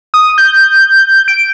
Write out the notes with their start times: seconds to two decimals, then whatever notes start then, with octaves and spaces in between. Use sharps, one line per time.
0.14 D#6
0.38 G6
1.28 D7